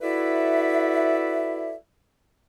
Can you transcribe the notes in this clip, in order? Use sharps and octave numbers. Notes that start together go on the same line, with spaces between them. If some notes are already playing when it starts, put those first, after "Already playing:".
E4 F#4 A4 B4 D5 E5